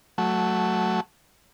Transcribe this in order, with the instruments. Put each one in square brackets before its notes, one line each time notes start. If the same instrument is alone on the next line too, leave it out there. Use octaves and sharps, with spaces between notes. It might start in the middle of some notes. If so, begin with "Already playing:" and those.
[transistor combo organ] F#3 A3